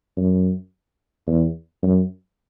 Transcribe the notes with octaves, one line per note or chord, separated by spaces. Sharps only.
F#2
E2
F#2